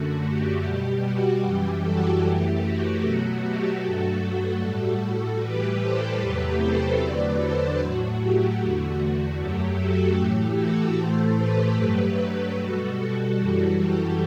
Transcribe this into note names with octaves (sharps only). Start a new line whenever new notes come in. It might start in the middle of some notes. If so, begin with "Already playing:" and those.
Already playing: F#2 D3 A3 F#4
G4
B2 G3 G4
F#4
F#2 E3 G3 G4
F#4 A4
F#2 E3 A3 G4
F#4
B2 F#3 A3 F#4
G4
G2 F#3 A3 F#4 A4
F#4 A4
A2 G3
A2 E3 G3 G4 B4
A4 C5
E2 C3 F#3 A3 G4 B4
A4 C5
E2 D3 F#3 A3 B4 D5
A4 C5
A2 F#3 A3 F#4
G4
E2 D3 A3 F#4
F#4
F#2 F#3 A3 G4
F#4 A4
A2 E3 A3 G4
F#4 A4
A2 E3 A3 A4 C5
G4 B4
G2 F#3 A3
B2 G3 F#4 A4
F#2 E3 G3
G4